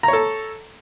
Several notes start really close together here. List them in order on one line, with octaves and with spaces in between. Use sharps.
A#5 C#5 A4